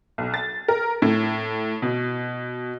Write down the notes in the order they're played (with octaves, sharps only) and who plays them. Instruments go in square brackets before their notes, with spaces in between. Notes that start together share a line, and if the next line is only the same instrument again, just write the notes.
[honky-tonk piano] B1
A6
A#4
A2
B2